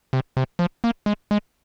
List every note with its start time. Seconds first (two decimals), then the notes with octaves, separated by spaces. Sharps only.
0.13 C3
0.37 C3
0.59 F3
0.84 A#3
1.06 G#3
1.31 G#3